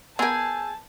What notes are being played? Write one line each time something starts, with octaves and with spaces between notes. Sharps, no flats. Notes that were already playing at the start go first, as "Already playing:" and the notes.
B3 G#4 A#4 G#5 A5 E6 G6